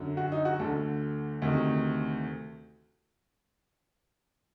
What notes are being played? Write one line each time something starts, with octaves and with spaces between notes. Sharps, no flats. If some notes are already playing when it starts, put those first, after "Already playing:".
Already playing: F#2 D3
F#4
D#4
F#4
D2 D3 A4
D2 C3 D#3